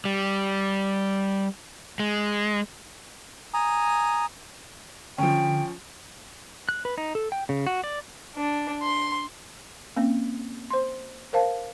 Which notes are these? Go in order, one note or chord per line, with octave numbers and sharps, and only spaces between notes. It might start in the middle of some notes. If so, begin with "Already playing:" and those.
G3
G#3
G#5 A#5 D#6
D3 F3 C#4 G5
F#6
B4
D#4
A4
G5
C#3
F#4
D5
D4
C6
A#3 C4 C#4
C5 C6
A#4 C5 F5 A5